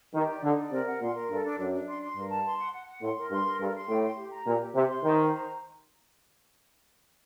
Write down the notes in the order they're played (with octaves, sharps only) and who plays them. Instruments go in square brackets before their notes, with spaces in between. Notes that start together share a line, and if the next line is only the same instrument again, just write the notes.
[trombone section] D#3 [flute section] G4
[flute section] D5
[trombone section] D3 [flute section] D#4
[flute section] D5
[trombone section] C3 [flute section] A#4
[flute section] F#5
[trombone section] A#2 [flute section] C6
[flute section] A#4
[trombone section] G2 [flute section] A4
[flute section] D4
[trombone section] F#2 [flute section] D4
[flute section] D4
C6
C6
[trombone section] G2 [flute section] A#4
[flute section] A5
C6
F#5
F#5
F#5
[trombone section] A2 [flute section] C6
[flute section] A#4
[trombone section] G2 [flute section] C6
[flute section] A#4
[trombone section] G2 [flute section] A4
[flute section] C6
[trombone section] A2 [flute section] G5
[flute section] C6
G4
A#5
[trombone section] A#2 [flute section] G4
[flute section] G4
[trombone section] C3 [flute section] C5
[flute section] C6
[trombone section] D#3 [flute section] C5
[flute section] C5
A#5